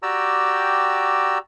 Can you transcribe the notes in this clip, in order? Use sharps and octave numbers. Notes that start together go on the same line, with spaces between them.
F#4 G4 D5 G5 A#5 E6